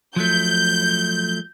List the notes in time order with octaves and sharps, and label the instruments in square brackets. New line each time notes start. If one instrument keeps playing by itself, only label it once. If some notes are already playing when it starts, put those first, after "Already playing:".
[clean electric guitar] F3 F#3 A3 [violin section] G6